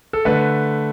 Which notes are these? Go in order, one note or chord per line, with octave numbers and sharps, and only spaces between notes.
A4
D3 A3 B4